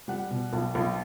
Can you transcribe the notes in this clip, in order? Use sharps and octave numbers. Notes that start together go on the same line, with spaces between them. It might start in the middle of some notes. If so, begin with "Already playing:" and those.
G3 F#5
B2
B1
B1